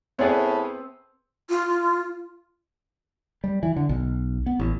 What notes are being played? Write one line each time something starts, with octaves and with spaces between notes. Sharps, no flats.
A2 B3 C4 G#4 B4 C#5 D5
F4
G3
E3
D3
B1
B3
A1